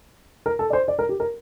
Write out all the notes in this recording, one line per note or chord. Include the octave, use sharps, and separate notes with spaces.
A#4
A4
D5
C5
D5
A#4
G4
A#4